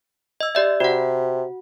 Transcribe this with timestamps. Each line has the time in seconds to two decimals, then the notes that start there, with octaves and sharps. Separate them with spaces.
0.41 D#5 E6
0.55 G4 D5 E5
0.80 C3 F#4 F#5